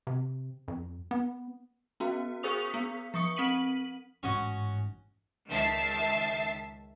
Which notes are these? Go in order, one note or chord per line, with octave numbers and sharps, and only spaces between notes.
C3
F2
B3
B3 C#4 F#4
G#4 A#4 C5 C#6 D#6 F7
B3 B6
F3 C#6 D#6 C#7
C4 B6 D#7 F#7
A1 G#2 C#4 F#4 D#5
C#2 D#3 E5 A5 C7